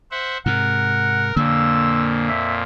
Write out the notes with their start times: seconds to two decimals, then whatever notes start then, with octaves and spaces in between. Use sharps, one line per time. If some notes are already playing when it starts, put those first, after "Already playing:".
0.11 C5 E5 F#5
0.46 G#2 C3 A#4 F#5
1.36 F2 A#2 D3 A#3 E6
2.29 E5